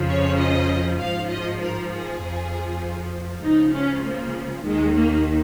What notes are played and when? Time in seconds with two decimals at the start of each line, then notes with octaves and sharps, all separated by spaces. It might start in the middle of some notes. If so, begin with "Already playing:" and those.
Already playing: F2 C#3 F3
0.08 C#5
0.38 D#5
0.99 G#2 F3 F5
1.29 D#5
1.60 A#4
1.91 G#4
2.21 F2 F3
3.43 C#2 C#3 F3 D#4
3.73 C#4
4.03 A#3
4.64 D#2 D#3 G#3
4.95 A#3